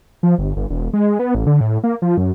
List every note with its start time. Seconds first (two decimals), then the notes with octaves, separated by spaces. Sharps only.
0.23 F3
0.38 G1
0.56 G1
0.70 E1
0.93 G#3
1.19 B3
1.35 A1
1.47 D3
1.61 A2
1.84 A#3
2.02 F3
2.17 F#2